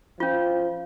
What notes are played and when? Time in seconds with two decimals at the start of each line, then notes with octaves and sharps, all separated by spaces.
0.20 F3 C#4 F4